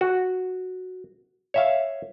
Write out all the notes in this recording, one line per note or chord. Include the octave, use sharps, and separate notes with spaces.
F#4
C#5 E5 F5